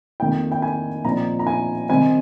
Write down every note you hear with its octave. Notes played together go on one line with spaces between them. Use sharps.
F2 D#3 A#3 D#4 G5
G5
G#5
A#2 F3 C4 D#4 A#5
A#5
G#5
C3 D#3 G3 C4 D#4 G#5